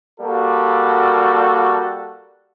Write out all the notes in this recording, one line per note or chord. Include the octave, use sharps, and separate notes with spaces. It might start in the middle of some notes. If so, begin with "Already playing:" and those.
G3 A#3 F#4 A4